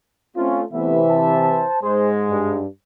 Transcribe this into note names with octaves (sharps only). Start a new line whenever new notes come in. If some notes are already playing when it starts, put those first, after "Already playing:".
A3 C4 C#4 F4
C3 E3 G3 A3 B3 E5
C5 A5
G#2 G#3 G#4 C5
G2